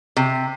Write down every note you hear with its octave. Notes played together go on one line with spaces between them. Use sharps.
C3